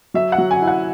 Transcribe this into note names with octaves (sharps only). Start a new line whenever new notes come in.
F#3 E5
F#5
F#3
G#5
E4
F#5